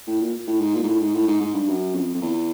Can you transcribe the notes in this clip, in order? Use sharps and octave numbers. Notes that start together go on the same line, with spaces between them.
A2
A#2
A2
G#2
A#2
G#2
A2
G#2
A2
G#2
G#2
G2
F#2
F2
F2
E2